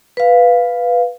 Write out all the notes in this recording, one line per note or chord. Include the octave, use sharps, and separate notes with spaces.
B4 F5